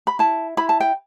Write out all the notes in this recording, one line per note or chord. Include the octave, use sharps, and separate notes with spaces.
B5
E4 A5
E4 B5
A5
G5